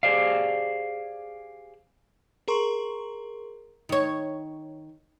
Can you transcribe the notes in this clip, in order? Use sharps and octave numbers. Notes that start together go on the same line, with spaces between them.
G4 G#4 C5 D5 F5
G#4 A#4 A#5 C6 C#6
D#3 C#5